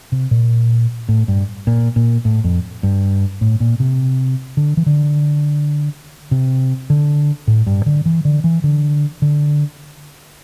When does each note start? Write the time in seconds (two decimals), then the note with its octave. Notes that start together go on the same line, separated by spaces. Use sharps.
0.12 C3
0.31 A#2
1.09 A2
1.28 G2
1.67 A#2
1.96 A#2
2.25 A2
2.44 F2
2.83 G2
3.41 A2
3.60 A#2
3.80 C3
4.57 D3
4.77 E3
4.86 D3
6.31 C3
6.90 D3
7.47 A2
7.67 G2
7.86 D3
8.06 E3
8.25 D3
8.44 E3
8.64 D3
9.22 D3